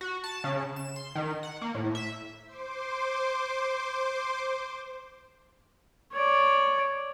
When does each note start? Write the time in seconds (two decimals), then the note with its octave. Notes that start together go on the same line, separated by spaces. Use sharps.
0.01 F#4
0.24 A5
0.44 C#3
0.76 E7
0.96 C6
1.15 D#3
1.43 F#5
1.62 A#3
1.75 A2
1.95 E5
2.46 C5 C6 D6
6.13 C#5 D5